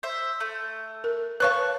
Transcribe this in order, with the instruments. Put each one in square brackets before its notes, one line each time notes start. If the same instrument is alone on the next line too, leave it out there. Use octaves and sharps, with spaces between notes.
[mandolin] C5 E5
A3
[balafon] A#4
[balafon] B4 C#5 F5 [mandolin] A5 C#6 F#6